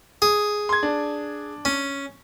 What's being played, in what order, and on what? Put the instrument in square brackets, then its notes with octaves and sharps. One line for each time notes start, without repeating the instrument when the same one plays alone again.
[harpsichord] G#4
[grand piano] C6 G#6
D4
[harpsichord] C#4